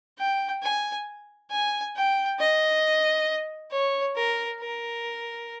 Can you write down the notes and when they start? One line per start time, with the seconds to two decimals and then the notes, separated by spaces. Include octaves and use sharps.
0.19 G5
0.63 G#5
1.51 G#5
1.96 G5
2.40 D#5
3.72 C#5
4.16 A#4
4.61 A#4